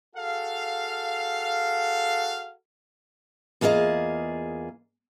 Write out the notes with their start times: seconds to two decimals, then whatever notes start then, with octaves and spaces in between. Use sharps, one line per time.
0.16 F#4 G#4 A4 F5
3.61 E2 A#3 F4 G#4 D#5